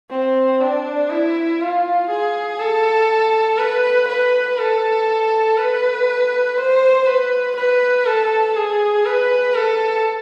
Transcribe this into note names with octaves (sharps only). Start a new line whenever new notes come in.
C4
D4
E4
F4
G#4
A4
B4
B4
A4
B4
C5
B4
B4
A4
G#4
B4
A4